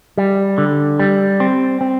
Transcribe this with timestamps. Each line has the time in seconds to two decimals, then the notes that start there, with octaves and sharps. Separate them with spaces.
0.18 G3
0.58 D3
0.99 G3
1.40 C4
1.81 C4